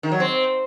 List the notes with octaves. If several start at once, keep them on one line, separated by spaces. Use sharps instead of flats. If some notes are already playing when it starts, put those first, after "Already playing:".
D#3
F#3
C4